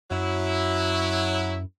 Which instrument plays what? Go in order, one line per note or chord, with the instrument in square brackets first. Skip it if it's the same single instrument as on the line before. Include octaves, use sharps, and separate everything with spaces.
[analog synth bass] F#2 [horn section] F#3 E4